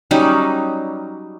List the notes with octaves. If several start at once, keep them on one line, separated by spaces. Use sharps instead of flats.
F#3 G3 C#4 D#4